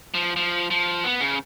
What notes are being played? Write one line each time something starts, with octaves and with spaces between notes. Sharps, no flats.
F3
F3
F3
B3
C#3